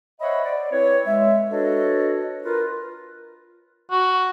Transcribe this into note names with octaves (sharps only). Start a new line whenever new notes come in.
C5 C#5 D#5 E5 F#5 B5
D5
C4 E4 B4 C#5
G#3 E5
D4 F#4 A4 B4 C#5 D#5
F4 A#4 B4
F#4